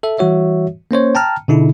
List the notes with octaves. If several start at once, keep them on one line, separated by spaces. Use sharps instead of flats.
A4 E5
E3 G3 F#4 C#5 E5
A#3 C#4 C5 C#5
G5 A5 A#5 F6
B2 D3 D#4 E4 G#4